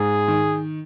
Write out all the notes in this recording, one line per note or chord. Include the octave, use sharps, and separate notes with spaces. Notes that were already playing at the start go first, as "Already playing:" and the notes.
Already playing: G#2 G#3 G#4
D#3